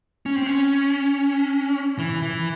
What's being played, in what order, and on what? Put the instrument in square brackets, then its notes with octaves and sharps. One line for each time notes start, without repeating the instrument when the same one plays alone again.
[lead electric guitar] C#4
C4
C#4
E3
E3